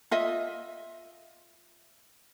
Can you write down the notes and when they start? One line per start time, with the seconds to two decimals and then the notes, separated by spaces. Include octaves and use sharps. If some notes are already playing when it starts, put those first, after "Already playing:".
0.11 F4 D#5 E5